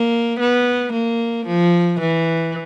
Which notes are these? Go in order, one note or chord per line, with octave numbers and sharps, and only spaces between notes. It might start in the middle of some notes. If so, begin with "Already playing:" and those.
Already playing: A#3
B3
A#3
F3
E3